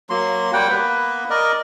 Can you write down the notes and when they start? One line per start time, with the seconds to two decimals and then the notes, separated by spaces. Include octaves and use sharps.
0.10 F#3 A#3 C6
0.53 G3 A#3 F#5 G5
0.69 A#3 B3 B4
1.30 A#4 D5 D#5